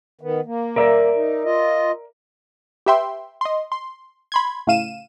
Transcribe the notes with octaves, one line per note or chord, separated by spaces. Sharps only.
D#3 B3
A#3
A#4 D5 E5
D#4
F4 D#5
G4 B4 E5 G5 C6
D#5 C6
C6
B5 C6 G#6
A2 C#3 F5 D#7 E7